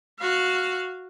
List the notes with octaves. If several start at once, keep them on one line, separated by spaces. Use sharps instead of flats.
F#4 F5